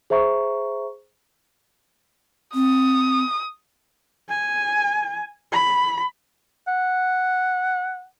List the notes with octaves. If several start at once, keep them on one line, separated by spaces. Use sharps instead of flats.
G#4 C5 E5 A#5 C#6
C4 D#6
G#5
B5
F#5